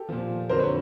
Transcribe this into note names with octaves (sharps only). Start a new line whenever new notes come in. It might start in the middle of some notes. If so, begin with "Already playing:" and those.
Already playing: G4 A4
A#2 F3
F2 D3 F#3 A#4 C5
B4 C#5